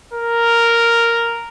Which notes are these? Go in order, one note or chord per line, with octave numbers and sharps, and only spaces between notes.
A#4